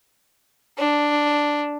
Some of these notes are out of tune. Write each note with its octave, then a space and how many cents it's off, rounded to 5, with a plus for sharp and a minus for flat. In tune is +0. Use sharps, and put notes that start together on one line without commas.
D4 +0